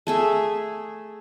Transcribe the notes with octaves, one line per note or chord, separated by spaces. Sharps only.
A3 G#4 E5